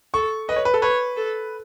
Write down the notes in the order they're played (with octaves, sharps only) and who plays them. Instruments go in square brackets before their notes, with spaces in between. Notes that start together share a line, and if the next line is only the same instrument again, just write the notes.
[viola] A4 [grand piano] C#6
[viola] B4 [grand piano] D#5
[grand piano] C#5
B4
A4
[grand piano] B4 [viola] C#5
[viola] A4